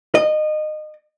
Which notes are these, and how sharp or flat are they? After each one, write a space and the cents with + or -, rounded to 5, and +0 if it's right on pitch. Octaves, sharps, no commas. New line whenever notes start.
D#5 -25